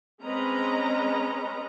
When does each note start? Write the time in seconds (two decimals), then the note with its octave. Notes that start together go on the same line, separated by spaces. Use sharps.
0.23 G#3 C4 C#4 B4 D#5 A#5